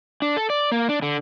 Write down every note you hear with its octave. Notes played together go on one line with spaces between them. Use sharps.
D4
A4
D5
A#3
D4
D3